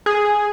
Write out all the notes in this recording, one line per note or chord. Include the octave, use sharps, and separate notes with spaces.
G#4